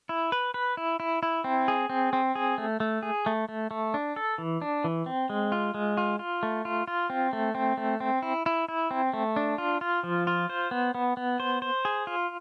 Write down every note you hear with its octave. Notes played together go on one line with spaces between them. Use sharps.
E4
B4
B4
E4
E4
E4
C4
G#4
C4
C4
G#4
A3
A3
G#4
A3
A3
A3
D4
A4
E3
D4
E3
C4
G#3
F4
G#3
F4
F4
A3
F4
F4
C4
A3
C4
A3
C4
E4
E4
E4
C4
A3
D4
F4
F4
F3
F4
C5
B3
B3
B3
C5
C5
G#4
F4